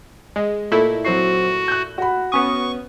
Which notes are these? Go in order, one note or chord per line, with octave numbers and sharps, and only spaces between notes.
G#3 D#5
A#2 A3 E4
F#3 C4 F#4 C7
F#6 G6
F#4 B5
B3 C#4 C#6 D#6